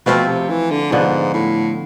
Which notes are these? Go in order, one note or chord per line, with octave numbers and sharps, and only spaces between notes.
B2 F3 A3 C4 F4
C3
E3
D3
G#2 D3 F3 B3
A2